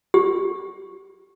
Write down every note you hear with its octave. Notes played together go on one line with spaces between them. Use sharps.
G4